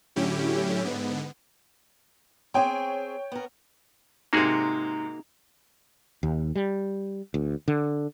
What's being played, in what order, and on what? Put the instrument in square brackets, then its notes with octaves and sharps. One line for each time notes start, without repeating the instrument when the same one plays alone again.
[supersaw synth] A2 D3 F#3 C#4 E4 G4
G#2 D3 B3
[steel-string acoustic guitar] C4 G#4 [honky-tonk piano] C#5 G5
[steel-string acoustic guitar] B3 A#4
[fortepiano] G#2 C3 [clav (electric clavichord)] A#3 F#4 G#4 [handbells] D#4 A#5
[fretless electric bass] D#2
G3
D2
D3